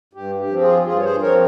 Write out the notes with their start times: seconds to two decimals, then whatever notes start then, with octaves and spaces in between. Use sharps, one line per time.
0.13 G2 G4
0.38 G4
0.50 F3 C4
0.61 F4 G#4
0.85 G2 F4 G#4
0.99 C#5
1.03 G#4 C5
1.21 F3 C4 A#4 C#5